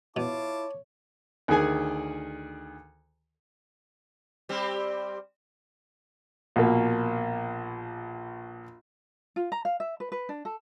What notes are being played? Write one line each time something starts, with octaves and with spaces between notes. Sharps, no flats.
B2 E4 F4 C#5 A5 D6
D2 D#3 G#4 G#5
G3 C4 G4
A#1 B2 A#3
F4
A#5
F5
E5
B4
B4
D4
A4